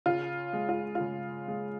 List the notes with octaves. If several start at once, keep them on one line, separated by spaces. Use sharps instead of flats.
C#3 F4
G#3
F4
C#3 F4
G#3